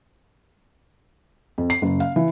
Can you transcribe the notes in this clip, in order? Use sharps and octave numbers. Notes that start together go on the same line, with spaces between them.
F2
C7
F#1
F5
E3